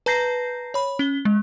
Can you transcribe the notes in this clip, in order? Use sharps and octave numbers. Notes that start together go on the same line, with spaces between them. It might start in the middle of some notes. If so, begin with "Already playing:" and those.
B4 A5 A#5 G6 A#6 C7
C#5 B5
C#4 G7
G#3